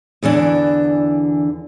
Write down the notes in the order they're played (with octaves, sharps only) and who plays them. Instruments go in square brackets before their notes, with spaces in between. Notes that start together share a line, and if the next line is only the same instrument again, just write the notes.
[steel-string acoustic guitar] E2 D3 E3 D4